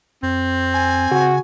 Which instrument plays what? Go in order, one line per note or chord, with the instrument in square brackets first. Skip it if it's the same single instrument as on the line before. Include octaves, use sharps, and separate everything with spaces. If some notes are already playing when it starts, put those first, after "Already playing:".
[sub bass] F2 [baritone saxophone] C4
[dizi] G#5
[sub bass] C#3 [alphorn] F#4